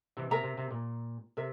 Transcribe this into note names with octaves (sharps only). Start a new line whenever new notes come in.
C3 E3
C3 A#4 E5 A#5
C3
C3
A#2
C3 A#4 E5